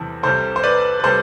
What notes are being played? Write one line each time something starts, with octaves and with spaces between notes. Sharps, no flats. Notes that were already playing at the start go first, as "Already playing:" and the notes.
Already playing: E2 C3 G3 A4
C2 C3 G3 A4 C5
C5
B4 D5
B4
C3 G3 A4 C5